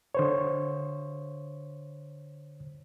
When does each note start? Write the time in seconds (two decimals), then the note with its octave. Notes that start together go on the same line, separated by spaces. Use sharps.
0.15 D3 C5 C#5